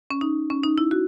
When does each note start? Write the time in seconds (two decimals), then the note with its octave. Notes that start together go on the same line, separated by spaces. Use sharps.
0.10 C#4
0.21 D#4
0.50 C#4
0.64 D#4
0.78 E4
0.91 F#4